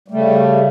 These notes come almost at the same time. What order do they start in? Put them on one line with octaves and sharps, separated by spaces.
G3 A3 C#3